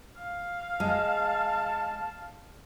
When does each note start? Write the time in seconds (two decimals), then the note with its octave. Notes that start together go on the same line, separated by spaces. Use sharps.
0.17 F5
0.80 G#3 A5